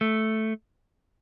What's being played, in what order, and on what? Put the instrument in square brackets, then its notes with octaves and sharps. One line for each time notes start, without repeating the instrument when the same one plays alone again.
[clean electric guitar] A3